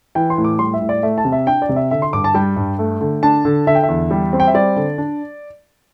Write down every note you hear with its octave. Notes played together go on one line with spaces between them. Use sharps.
E3 G5
C6
A2
D6
G3 C6
E5
A2
D5
A3 E5
A5
C3
E5
D4 G5
D5
C3
E5
D3 E5
C6
G2 D6
A5
G3 G5
G2
A3
D3
D4 A5
D3
D3 E5
G5
E5
E2
G3
C4
G5
E5
G3 D5
D3
D4